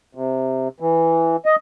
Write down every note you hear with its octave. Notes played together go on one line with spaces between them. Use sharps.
C3
E3
D#5